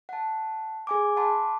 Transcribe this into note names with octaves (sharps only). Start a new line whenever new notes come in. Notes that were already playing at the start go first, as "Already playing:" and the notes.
F#5 A5
G#4 G#5 D6
F#5 A5 B5 C6 D6